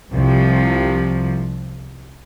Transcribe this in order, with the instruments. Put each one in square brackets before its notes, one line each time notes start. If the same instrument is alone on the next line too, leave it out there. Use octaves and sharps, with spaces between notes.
[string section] C2 C3 F3